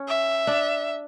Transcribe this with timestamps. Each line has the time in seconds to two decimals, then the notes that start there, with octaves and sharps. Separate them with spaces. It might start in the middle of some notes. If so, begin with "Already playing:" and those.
Already playing: C#4
0.08 E5
0.47 D4